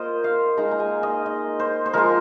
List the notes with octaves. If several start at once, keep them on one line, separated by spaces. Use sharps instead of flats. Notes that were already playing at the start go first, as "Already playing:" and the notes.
Already playing: A#3 F4 C5 D#5
F5
G#3 D#4 A#5
A#5
G#5
D#5
D#5
C5
C5
F3 G#3 F4 A#4